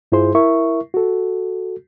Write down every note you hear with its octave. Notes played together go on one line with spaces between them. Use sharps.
G2 E4 F4 G#4 C5 C6
E4 A#4 E5 C#6
F#4 A4